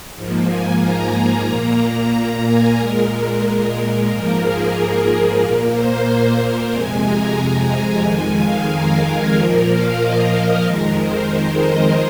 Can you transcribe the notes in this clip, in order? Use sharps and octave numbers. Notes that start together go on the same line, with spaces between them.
G#2 F3 A#3
G#5
A#5
A#2 A#3 A#5
A#5
G#5
A#2 G#3 A#4
A#4
A#4
G#2 F3 A#3
G#4
A#4
A#4
A#2 A#3
C5
C5
F2 C3 G#3 G#5
A#5
G#5
F2 D#3 G#3 G#5
F5
A#4
A#4
A#2 F3 A#3 A#4
F5
D#5
F2 D#3 G#3 A#4
C5
D#5